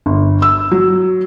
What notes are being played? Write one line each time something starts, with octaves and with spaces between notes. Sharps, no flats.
G1
E6
F#3